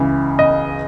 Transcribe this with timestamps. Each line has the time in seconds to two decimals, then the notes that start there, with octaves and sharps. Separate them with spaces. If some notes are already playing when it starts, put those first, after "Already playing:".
Already playing: C#2 C#3 E3
0.39 D#5